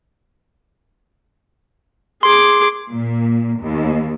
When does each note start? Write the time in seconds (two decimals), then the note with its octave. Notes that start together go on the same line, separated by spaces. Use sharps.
2.23 G#4 C6 D6
2.89 A#2
3.61 D#2